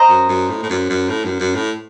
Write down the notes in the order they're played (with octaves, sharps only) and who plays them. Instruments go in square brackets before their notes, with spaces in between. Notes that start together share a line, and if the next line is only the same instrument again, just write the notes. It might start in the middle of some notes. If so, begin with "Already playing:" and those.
Already playing: [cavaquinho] C5 D#5 A#5
[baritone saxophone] F#2
F#2
A2
A2
F#2
F#2
A2
F#2
F#2
A2